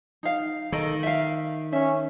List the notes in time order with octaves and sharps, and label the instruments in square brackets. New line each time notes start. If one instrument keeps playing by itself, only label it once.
[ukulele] D#4 F5
[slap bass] D#3 [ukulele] A4 D#5
[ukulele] E5 F5
[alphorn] C#4 [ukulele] E5